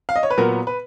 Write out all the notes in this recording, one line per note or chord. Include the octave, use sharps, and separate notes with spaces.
F5
D#5
C#5
B4
A#2 F#3 B3 A#4
B4